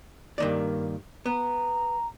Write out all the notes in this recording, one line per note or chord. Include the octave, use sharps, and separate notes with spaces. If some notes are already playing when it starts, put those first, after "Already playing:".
G2 D#3 A#3 D5
B3 A#5